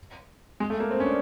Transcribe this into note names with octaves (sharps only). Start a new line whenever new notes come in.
G#3
A3
A#3
C4
C#4
D4